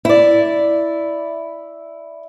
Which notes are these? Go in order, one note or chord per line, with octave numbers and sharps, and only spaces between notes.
E4 D5